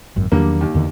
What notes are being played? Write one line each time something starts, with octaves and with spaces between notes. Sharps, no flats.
G#1 F#2
E2 D3 D#3 F#3 G3 A#3
D#2
E2 D3 D#3